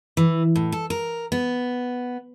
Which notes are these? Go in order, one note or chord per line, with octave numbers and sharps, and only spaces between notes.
E3
A2
A4
A#4
B3